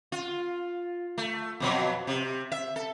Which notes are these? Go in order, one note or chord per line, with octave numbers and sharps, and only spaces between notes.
F4
A3
F2 B2 F#3
C3
E5
A4